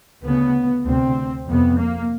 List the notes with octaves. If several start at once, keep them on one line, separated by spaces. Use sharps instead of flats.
D2 C#3 B3
D2 C3 C4
F2 C3 B3
A#3